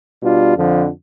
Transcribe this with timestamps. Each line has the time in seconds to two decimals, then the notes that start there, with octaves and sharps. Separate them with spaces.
0.21 B2 G3 D4 F4
0.54 F2 D3 F3